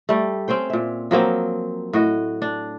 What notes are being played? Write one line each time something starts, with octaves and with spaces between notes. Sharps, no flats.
G3 A3
C4 C#4 C5 G5
A#2 E5
F3 F#3 A#3 C4
A2 F#4 D#5
D4